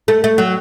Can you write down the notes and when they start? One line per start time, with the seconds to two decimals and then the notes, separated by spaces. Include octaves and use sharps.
0.08 A3
0.24 A3
0.38 F#3